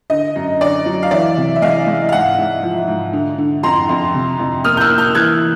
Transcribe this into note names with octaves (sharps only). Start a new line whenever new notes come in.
D3 D#5
F#2
D3 D5
F#3
F5
E3 D5 E5
C3
E5
G#3 D#5 F5
G#3
F5
G#2 E5 F#5
G#2
F3
G#2
D3
D3
F2 A#5 C6
F2
C3
F2
A#3 D#6 F6
G6
E6 F#6
A#3
F6 G6
E3 F#6 G#6